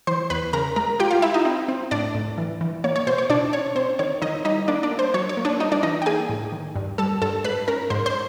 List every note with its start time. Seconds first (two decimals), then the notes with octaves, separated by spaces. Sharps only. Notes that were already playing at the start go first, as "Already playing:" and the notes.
0.07 E3 C5 C6
0.30 E2 B4 B5
0.53 C#3 A#4 A#5
0.76 G#3 A#4 A#5
1.00 F4 G4 G5
1.11 F4 F5
1.22 E4 F4 E5
1.34 D#4 D#5
1.45 C4
1.68 C4
1.91 A2 D4 D5
2.15 A2
2.38 E3
2.61 E3
2.84 A#3 C#5
2.96 C#5
3.07 B2 C5
3.18 C#5
3.30 B2 D4 D5
3.53 C#4 C#5
3.76 C4 C5
3.99 D#3 C#5
4.22 D#3 D#4 D#5
4.45 G3 D#4 D#5
4.68 A#3 D4 D5
4.83 D4 D5
4.91 A#3
4.99 C5
5.14 F#3 C#5
5.29 C#5
5.37 A#3
5.45 D4 D5
5.60 G3 D#4 D#5
5.72 D4 D5
5.83 E3 D#4 D#5
6.02 G5
6.06 A#3 G#4 G#5
6.29 A2
6.52 D#3
6.75 G2
6.98 G3 A4 A5
7.22 G2 A4 A5
7.44 G#2 B4 B5
7.68 C#4 A#4 A#5
7.90 G#2 C5 C6
8.06 C5 C6